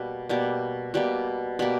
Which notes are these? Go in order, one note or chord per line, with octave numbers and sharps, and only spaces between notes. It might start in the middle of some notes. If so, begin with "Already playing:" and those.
Already playing: B2 G3 A#3
B2 G3 A#3
B2 G3 A#3
B2 G3 A#3 B5